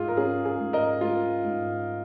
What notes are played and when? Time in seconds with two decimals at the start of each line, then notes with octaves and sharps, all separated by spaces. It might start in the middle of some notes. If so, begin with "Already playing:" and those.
Already playing: G#2 G#3 F4 G#4
0.08 A#4
0.17 C#4 G#4
0.45 G#4
0.60 G#2
0.73 A#4 D#5
1.01 G#3 F4
1.44 G#2